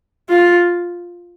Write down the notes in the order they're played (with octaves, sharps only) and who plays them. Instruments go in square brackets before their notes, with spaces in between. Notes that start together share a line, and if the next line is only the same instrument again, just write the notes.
[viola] F4